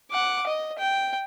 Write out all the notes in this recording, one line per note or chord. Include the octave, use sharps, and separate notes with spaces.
F#5 D6
D#5
G5